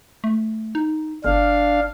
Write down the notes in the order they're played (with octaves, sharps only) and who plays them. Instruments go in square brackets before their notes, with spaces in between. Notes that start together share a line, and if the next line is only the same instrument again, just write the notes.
[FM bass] A3
D#4
[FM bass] G1 [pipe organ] D4 F5